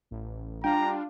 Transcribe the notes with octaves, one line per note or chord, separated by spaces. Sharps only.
A1
G3 D4 F4 G5 A#5